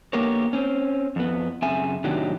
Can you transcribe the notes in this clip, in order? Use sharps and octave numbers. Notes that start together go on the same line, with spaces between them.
D3 A#3 B3 G4 A#4 C#5
C4 C#4
F2 B3
F#2 C#3 C4 E5 G#5
A2 C3 D#3 F#3 D4 G4